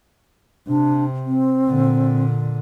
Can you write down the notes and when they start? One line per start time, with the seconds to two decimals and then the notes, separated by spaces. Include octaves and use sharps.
0.67 C3 D4
1.26 C4
1.68 A#2 D3